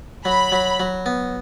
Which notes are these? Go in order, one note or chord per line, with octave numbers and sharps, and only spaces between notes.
F#3 B5
F#3
F#3
B3